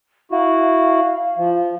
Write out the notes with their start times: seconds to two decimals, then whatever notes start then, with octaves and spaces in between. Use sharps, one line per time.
0.32 E4 F#4 F5
1.38 F3